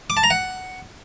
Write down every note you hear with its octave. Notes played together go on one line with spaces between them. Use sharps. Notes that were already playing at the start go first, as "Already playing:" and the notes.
D6
A5
A#5
F#5